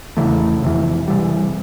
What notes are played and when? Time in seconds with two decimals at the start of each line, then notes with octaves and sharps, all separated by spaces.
0.17 E2 C#3 E3 A3
0.62 F2 C3 E3
1.08 C3 E3 G3